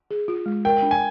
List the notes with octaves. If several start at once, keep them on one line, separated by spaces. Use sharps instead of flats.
G#4
F4
G#3
A#4 G5
D4
G#5